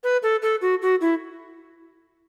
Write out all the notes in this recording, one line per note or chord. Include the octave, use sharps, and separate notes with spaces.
B4
A4
A4
F#4
F#4
E4